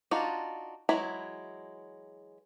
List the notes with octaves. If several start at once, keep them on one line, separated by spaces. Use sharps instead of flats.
D4 D#4 F4 F#4
E3 F#3 G#3 E4 B5